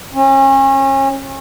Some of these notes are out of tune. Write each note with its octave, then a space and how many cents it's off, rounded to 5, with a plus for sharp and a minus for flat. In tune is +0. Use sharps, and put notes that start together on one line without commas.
C#4 -35